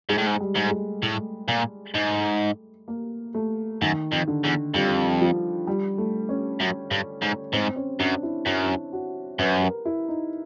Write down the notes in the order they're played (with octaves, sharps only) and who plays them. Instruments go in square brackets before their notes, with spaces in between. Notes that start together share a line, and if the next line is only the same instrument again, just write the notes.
[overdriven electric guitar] G#2 [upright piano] G#3
[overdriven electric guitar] A2
G#2
[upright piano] G3
[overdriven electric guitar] G#2
[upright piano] A3
G#3
[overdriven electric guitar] A2 [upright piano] A3
[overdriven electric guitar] A#2
G#2
[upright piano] A#3
A3
[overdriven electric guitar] F#2 [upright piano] D#3
[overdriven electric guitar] F2
[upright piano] D3
[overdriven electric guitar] E2
[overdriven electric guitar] F2 [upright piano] G3
[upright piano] F3
G3
A3
C#4
[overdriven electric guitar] F#2
G2
G#2
[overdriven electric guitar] G#2 [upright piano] C4
[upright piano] C#4
[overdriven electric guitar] F#2 [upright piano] D4
[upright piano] E4
[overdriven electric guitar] F#2
[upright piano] F#4
[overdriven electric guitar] F#2 [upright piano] B4
[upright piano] A#4
E4
D#4